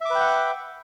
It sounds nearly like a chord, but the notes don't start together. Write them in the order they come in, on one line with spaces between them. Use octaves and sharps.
E5 D6 B4 G5 F#5